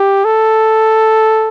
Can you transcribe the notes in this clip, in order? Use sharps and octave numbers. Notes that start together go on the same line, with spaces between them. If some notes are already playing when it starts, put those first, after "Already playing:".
Already playing: G4
A4